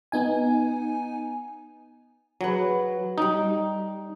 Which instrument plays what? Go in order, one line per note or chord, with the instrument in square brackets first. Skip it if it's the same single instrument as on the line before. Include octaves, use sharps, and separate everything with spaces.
[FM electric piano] B3 D#4 G#5
[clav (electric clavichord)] F#3 [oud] G#4 B4
[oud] G3 G4 [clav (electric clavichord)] D#4